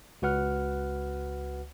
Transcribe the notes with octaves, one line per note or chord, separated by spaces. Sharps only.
C#2 F#4 B4 F#5 F6